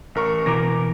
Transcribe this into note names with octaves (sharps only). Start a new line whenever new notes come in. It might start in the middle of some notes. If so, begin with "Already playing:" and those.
A1 A#4 C#6
B2 E3 A#4 D6 A#6